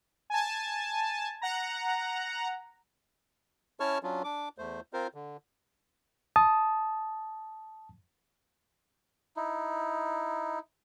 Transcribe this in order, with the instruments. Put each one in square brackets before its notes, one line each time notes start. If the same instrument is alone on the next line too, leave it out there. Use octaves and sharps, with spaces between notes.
[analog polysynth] G#5 A5
F#5 A#5
[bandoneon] C#4 E4 C#5 A5 C#6 F6
F#3 C#4 D4 F4
D4 D6
E2 A3 C5
C4 F4 A#4 C5
D3
[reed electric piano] A5 D#6
[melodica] D#4 E4